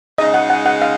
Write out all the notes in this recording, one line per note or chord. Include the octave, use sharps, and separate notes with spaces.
C#3 G#3 D#4 D#5
F#5
F#5
F#5
F5